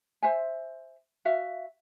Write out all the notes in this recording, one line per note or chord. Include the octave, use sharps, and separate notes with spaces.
C5 E5 G#5
F#4 E5 F5